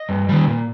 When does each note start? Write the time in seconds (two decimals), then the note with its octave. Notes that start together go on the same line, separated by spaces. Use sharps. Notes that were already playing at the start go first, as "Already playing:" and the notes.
Already playing: D#5
0.09 G2
0.29 D#3 G3
0.47 A#2